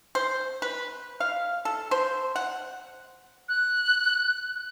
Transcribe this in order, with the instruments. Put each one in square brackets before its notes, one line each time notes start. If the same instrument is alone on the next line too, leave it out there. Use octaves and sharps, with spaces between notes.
[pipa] C5
B4
F5
A4
C5
F#5
[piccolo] F#6